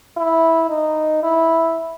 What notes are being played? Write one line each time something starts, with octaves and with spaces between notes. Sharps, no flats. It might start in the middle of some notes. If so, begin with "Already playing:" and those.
E4
D#4
E4